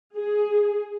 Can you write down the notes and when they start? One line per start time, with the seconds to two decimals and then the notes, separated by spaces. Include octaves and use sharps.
0.16 G#4